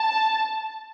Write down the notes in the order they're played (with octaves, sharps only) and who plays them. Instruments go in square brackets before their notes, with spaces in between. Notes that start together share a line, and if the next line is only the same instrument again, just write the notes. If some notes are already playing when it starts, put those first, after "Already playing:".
Already playing: [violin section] A5